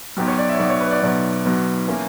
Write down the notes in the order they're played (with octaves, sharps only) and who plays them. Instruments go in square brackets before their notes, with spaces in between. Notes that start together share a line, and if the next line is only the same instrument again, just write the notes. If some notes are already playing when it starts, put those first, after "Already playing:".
[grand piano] B1 B2 F#3 G4
C#5
D5
E5
C#5
B1 B2 F#3 D5
C#5
B4
D5
B1 B2 F#3 D5
B1 B2 F#3
E3 A#3 C#4